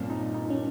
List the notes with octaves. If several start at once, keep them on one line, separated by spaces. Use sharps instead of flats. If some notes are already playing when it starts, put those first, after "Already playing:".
Already playing: G2 A#2 C4 C#4
D#4
D#4
C#4